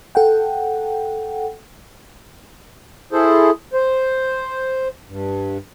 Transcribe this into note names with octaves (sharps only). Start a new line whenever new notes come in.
A4 F#5 G5
E4 G#4 A4 C5
C5
G2